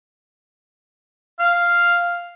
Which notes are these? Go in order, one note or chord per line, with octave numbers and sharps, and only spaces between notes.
F5